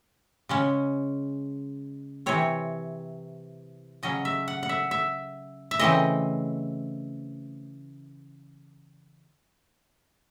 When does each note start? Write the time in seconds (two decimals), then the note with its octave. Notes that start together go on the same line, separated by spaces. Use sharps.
0.49 C#3 G#3 C#4
2.26 C3 E3 C4 C#5
4.03 C#3 F#3 C#4 D#5
4.25 E5
4.48 F#5
4.63 F#5
4.69 E5
4.91 E5
5.71 E5
5.79 C#3 E3 A3 C4 D#5